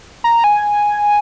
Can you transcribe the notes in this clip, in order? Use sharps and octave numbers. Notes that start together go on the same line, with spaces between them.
A#5
G#5